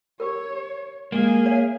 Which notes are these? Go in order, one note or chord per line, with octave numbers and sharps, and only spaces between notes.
G4 A#4 C#5
G#3 A#3 G#4 F5
C#5 E5